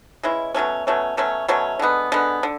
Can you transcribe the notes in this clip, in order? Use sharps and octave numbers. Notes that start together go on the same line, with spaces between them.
E3 G#3 C#4 E4
B2 F#3 A3 C#4
B2 F#3 A3 C#4
B2 F#3 A3 C#4
B2 F#3 A3 C#4
D3 G#3 B3
D3 G#3 B3
D3